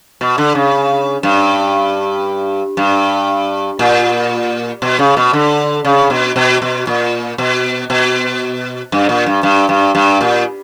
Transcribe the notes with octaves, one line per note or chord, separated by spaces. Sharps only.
B2
D3
C#3
G2
G2
A#2
B2
C#3
B2
D3
C#3
B2
B2
B2
A#2
B2
B2
G2
A#2
G2
G2
G2
G2
A#2